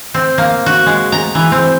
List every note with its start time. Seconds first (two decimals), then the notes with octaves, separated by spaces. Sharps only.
0.14 C4
0.38 A#3
0.66 F#4
0.86 G#3
1.12 A#5
1.35 E3
1.52 C4